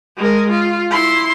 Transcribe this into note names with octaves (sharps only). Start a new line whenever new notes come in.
G#3 A#4
F4
E4 C6